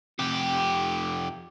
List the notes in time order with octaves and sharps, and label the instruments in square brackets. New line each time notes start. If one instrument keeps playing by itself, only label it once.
[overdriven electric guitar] F2 G4